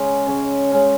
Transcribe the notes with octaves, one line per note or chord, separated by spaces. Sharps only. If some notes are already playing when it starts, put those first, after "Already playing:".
Already playing: C#3 G#3 C#4
C#3 G#3 C#4
C#3 G#3 C#4